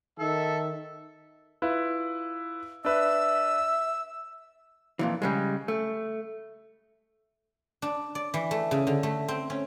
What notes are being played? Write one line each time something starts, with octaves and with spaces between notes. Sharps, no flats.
D#3 A4 E5
E4 F4 B4
D4 B4 E5 E6
F2 A#2 E3
C#3 G3 G#3
A3
D4
D5
E3
A3
C#3
D3
A3
C4
C#4